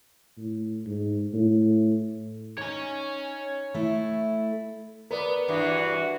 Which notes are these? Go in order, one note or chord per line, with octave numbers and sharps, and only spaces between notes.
A2
G#2
A2
D#4 C#5 G#5
A3 E4
B3 A#4 B4 D5
G2 E3 F#4